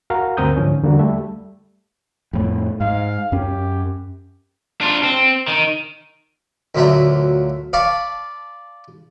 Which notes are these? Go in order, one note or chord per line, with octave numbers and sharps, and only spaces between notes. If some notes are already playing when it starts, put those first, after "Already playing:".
F#4 A#4 F5 F#5 A#5
D2 G2 C4 A#4 D#6 G6
G#2 D3 F3 C#4
E2 D3 G3 A#3 F#4
G3 A3 E5
F2 A2
G#2 F5
F#2 C#4 G4
D4 F4
C4
D#3
D2 A#2 F#3 A3 E5
D5 F5 A5 B5 C#6